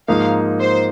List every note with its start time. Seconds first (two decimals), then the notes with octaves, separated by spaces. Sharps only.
0.08 G#2 F3 A#3 D#4 F5
0.60 C5